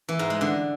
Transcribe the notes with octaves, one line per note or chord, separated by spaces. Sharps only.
E3
G#2
G#3
D3